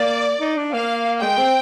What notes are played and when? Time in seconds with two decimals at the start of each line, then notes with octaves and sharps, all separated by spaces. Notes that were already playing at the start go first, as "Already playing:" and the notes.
Already playing: A#3 D5
0.40 D#4
0.57 D4
0.73 A#3 F5
1.21 G#3 G5
1.38 C4